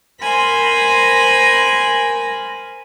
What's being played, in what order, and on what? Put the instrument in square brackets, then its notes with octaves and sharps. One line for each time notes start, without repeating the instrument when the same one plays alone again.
[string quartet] A#4 C5 G#5 B5